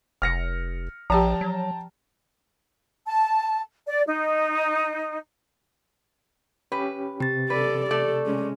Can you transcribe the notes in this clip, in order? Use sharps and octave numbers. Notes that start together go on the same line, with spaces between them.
F1 F6 A#6 C#7
A#1 F3 G4 G5 A5 A#5
F#3
A5
D5
D#4
C#4 G4 B4
C3 G4 A6
A4 B4 D5
A3 A4 D5
G#3 C#4